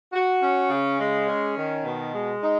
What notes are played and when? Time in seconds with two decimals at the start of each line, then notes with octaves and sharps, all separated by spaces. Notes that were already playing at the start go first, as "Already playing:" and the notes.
0.13 F#4
0.41 C#4
0.70 C#3
0.99 G#3
1.27 C#4
1.56 D#3
1.85 B2
2.13 G#3
2.42 D#4